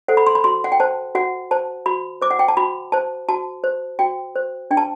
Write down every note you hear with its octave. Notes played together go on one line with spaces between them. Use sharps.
A4 C5 F#5
B5
C6
B5
F#4 C6
F#5
G5
C5 A5
F#4 F#5
C5 A5
F#4 B5
C5 D6
F#5
G5
A5
F#4 B5
C5 A5
F#4 A5
C5
F#4 G5
C5
D4 G5
A5